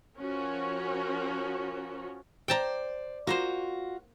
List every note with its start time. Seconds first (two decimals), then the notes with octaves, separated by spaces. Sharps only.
0.18 F3 C#4 F#4 A#4
2.48 C5 D5 G5 A5 A#5
3.27 A#3 F4 F#4 C5